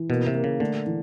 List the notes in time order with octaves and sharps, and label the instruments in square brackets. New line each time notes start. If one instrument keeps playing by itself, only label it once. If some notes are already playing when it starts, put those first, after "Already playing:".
Already playing: [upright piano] E3
[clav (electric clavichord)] B2 [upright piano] A#3
[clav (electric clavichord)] C3
[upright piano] A#3
[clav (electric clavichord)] C#3
[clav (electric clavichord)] D3 [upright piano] A3
[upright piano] E3